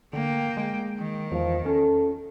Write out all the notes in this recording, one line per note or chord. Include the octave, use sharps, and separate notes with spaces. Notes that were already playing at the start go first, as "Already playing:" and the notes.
D3 A#3 G5
G#3
D#3
E2 F3
C#4 A4